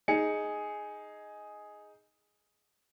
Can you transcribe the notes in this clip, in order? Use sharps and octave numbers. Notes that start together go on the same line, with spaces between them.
D#4 G#4 C#7